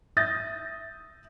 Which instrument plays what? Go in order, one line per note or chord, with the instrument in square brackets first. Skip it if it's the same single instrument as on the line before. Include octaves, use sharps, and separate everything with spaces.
[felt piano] E5 D#6 G6 A6 A#6